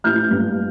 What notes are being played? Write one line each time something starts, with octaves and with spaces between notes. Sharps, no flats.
A1 F6 G6
G2